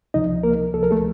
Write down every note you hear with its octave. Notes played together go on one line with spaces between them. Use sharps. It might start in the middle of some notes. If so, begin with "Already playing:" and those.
C#2 C3 F3 D#4 D#5
A#3 A#4
C#2 C3 F3 A4
A#4
A3 A4